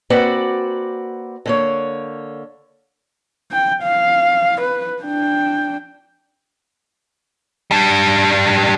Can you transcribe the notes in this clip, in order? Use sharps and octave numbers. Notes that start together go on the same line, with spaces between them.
A#3 C4 F#4 B4 D5 F#5
D3 A#3 C#5
G5
F5
B4
D4 G5
G3 D4